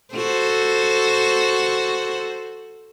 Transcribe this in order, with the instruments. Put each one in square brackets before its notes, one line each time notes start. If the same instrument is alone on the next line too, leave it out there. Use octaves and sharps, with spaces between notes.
[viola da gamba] F#4 A4 C5